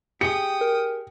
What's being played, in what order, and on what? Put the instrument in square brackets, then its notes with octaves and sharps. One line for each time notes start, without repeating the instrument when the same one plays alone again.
[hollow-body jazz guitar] G4 G#4 [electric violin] G5 D#6 [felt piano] C#7
[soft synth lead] A#4